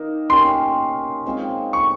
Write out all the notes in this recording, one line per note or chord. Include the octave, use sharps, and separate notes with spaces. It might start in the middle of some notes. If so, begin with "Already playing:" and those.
Already playing: D#3 A#3 D#4
A#3 C#4 G4 A#4 C6
G#3 C4 F4 G#4
C#6